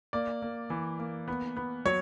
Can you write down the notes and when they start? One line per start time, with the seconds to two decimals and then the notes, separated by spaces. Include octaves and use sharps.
0.13 A#3 D5
0.42 A#3
0.70 E3
0.99 A#3
1.28 B3
1.57 B3
1.85 F#3 C#5